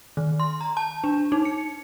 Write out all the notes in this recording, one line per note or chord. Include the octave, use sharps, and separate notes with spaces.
D#3
C6
A#5
A5
D4
D#4
C#7